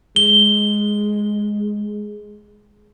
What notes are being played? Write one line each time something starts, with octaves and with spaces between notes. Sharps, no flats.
G#3 G7